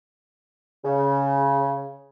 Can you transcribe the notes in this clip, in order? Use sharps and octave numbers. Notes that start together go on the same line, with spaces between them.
C#3